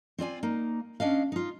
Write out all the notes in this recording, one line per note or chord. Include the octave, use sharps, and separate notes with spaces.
C4 F4 D5 G#5
A#3 D#4
C#4 D4 D#5 F5
D#4 F4